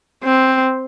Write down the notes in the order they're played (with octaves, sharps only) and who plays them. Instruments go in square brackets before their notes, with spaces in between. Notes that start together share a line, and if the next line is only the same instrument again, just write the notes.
[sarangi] C4